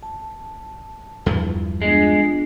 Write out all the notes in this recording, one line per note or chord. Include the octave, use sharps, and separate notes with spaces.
A5
E2 G2 F3
G#3 B3 D4 F4